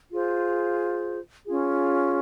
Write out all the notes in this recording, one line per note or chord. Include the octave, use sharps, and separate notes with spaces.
F4 G#4 C5
C#4 F4 G#4